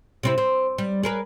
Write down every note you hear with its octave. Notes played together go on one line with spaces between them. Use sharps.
C3 C4 E4
C4
G3
G#4 A#4 B4